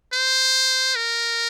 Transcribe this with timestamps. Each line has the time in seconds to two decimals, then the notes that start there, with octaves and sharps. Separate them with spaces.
0.13 C5
0.95 A#4